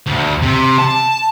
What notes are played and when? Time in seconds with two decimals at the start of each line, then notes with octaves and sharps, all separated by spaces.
0.07 D2
0.42 C3
0.78 A5